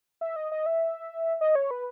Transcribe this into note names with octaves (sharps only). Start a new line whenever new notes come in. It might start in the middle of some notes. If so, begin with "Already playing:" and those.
E5
D#5
D#5
E5
D#5
C#5
B4